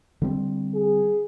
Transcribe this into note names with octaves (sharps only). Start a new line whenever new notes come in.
D3 G3 C4
G#4